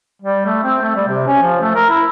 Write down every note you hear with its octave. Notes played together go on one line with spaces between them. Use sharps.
G3
A3
C4
A3
G3
C3
C#4
F3
A3
A#4
E4